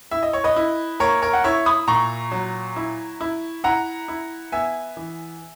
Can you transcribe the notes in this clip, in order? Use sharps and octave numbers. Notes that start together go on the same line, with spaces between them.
E4 E5
D#5
C#5
B4 D#5
E4
A#3 A#4 C#5
A#4 C#5
F#5
E4 C#5 E5
B5 D#6
A#2 A#5 C#6
F#3
E4
E4
E4 F#5 A#5
E4
B3 E5 G#5
E3